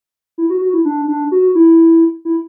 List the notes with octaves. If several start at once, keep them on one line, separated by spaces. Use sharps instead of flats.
E4
F#4
F#4
E4
D4
D4
F#4
E4
E4